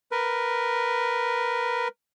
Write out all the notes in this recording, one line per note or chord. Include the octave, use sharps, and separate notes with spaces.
A#4 B4